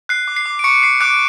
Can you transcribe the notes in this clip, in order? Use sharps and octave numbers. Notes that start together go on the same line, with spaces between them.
F#6 C7
D6
C7
D6
D7
C#6 D6 C#7
D6 C7
D6 F#6 D7